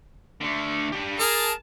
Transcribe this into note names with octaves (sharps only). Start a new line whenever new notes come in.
D3 A3
D4 G4
G#4 A#4 A5